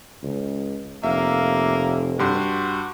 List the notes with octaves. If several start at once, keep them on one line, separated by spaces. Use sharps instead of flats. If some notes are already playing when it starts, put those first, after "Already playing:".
C#2
F1 A#3 E5 F5
G2 F#4 G4 C6